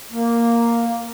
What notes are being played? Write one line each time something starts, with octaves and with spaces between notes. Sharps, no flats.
A#3